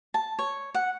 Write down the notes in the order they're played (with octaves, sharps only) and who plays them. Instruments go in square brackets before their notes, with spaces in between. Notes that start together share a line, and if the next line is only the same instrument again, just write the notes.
[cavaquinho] A5
C#5
F#5